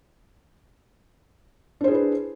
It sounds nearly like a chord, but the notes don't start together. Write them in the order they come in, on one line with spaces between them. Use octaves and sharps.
D4 C5 G#4 E4 B4